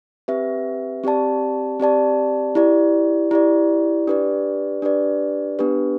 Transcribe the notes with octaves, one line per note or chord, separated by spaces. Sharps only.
C4 G4 B4 E5
C4 G4 D5 A5
C4 G4 D5 A5
E4 G4 D5
E4 G4 D5
D4 G4 B4 D5
D4 G4 B4 D5
B3 D4 G4 B4